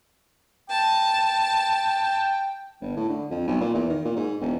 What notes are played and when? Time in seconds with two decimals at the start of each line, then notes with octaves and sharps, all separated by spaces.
0.70 G5 A5
2.81 G1
2.96 A2
3.10 D3
3.30 F2
3.47 B1
3.61 A#2
3.74 E2
3.90 D#3
4.05 A#2
4.16 G#2
4.41 E1